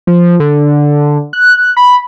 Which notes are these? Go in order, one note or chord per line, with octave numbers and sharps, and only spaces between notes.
F3
D3
F#6
B5